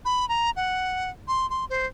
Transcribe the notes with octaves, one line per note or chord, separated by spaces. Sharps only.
B5
A#5
F#5
C6
C6
C5